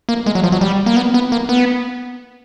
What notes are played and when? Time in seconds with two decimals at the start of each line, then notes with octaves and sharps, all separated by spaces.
0.09 A#3
0.26 G#3
0.35 F#3
0.44 F3
0.52 F#3
0.61 G3
0.86 A#3
0.96 B3
1.14 B3
1.32 A#3
1.49 B3